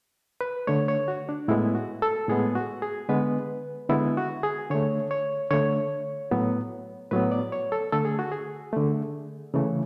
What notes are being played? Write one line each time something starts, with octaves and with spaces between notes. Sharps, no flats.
B4
D3 A3 C#5
C#5
F#4
D4
A2 G#3 B3 E4
F#4
A4
A2 G#3 B3 G#4
F#4
G#4
D3 G#3 B3 B4
D3 G#3 B3 E4
F#4
G#4
D3 A3 C#5
C#5
D3 A3 C#5
A2 F#3 B3
A2 F#3 B3 B4
D5
C#5
A4
D3 A3 A4
G#4
F#4
G#4
D3 A3
C#3 E3 A3